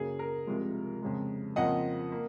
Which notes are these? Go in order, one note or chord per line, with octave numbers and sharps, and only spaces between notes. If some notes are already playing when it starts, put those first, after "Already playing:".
Already playing: F#2 C#3 F#3 A#3 G#4
A#4
C2 C3 F3 G#3
F2 C#3 G#3
F2 C#3 F3 A#3 D#5 F#5
A#3